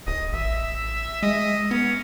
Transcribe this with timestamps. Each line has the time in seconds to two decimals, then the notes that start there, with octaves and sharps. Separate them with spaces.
0.07 D1 D#5
0.33 A1 E5
1.23 G#3 D#5
1.71 B3 C#4